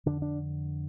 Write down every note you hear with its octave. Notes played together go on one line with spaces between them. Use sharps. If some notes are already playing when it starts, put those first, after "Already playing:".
F2 D3 D4
D4